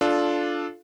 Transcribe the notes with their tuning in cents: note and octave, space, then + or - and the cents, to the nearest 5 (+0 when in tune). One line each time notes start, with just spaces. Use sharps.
D4 +0 F4 +0 A4 -15